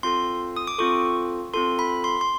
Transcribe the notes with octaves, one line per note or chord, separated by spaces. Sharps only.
C4 F4 A4 C6
D#6
D6
C4 F4 A4 C#6
C4 F4 A4 C6
B5
C6
C6